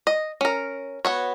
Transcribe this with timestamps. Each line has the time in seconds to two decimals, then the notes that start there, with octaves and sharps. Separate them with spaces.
0.07 D#5
0.41 C#4 A#4
1.05 B3 F#4 C#5